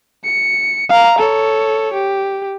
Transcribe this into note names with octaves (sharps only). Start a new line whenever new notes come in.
C#7
F5 A#5
A4 C#5
G4